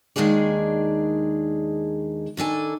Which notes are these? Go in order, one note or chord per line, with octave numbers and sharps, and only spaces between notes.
D#2 D#3 G#3 D4 G#4 D5
D#3 D4 A4 G#5